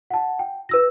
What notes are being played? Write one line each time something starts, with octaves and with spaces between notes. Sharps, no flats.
F#5 A5
G5
B4 E6 A#6